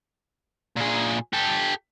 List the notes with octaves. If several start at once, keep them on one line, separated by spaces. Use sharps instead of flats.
A#2 G#4
G4 A4